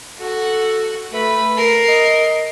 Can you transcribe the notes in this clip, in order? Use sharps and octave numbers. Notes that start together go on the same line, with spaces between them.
F#4 A4 F#5
A3 B4 B5
A#4 C7
D#5